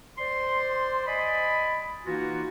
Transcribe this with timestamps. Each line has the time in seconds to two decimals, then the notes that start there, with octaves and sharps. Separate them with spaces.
0.17 C5 D5 C6
1.07 D5 D#5 G#5 B5
2.06 E3 A#3 D#4 F4 F#4